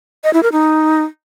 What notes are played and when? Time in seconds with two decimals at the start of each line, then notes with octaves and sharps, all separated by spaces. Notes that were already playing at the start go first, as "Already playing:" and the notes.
0.24 D#5
0.33 E4
0.43 A#4
0.52 D#4